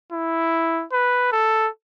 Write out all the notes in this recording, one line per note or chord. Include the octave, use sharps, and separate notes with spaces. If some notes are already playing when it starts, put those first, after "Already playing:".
E4
B4
A4